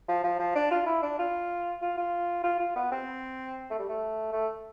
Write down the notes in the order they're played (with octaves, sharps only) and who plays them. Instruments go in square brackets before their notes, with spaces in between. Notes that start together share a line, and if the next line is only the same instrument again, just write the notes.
[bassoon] F3
F3
F3
D4
F4
E4
D4
F4
F4
F4
F4
F4
B3
C4
A3
G3
A3
A3